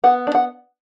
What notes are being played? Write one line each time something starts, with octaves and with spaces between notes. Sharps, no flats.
B3 F#5
D4
F#5